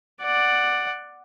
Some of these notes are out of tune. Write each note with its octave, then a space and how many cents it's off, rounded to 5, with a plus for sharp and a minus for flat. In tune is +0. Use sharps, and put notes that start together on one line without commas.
D5 +10 F#5 +0